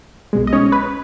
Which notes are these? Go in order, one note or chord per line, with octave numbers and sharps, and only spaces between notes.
B1 B2 G#3
D#5
C#4 C#5
B4